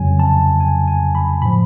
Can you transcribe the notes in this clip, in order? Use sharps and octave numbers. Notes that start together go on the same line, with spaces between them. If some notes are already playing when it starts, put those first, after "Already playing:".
Already playing: F2 C#3 F#3 G#5
A5
G#5
G#5
B5
A2 F3 B5